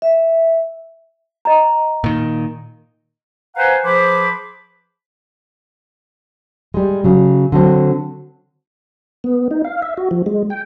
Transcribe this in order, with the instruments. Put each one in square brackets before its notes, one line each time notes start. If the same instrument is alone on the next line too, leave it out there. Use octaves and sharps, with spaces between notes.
[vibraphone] E5
[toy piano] D#5 A#5
[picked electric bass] A#2 D#3
[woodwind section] B4 C5 F5 F#5 G#5 A#5
F3 G#4 B4 C5 B5 D6
[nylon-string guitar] G3 G#3
C#3 F#3
D3 F#3 C4
[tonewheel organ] B3
D#4
F5
E5
F#4
F3
G#3
G5